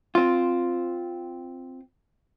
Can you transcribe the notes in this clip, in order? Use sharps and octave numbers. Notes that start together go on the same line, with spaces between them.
C4 F4